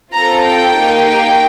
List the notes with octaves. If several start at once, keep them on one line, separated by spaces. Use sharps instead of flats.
C4 F4 A4 A#5
G5
A#3 D#4 G4
G5